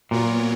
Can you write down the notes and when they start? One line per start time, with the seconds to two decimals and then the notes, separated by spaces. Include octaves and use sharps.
0.11 A#2 F#3 B3 F4 A#4 C#5